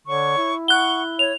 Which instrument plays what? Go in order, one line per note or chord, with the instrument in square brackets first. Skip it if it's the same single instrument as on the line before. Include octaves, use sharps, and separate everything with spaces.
[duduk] D3 [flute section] C#5 C#6
[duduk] E4
[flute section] F#5 C#6 [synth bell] F#6 G7
[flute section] C#5 [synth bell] F7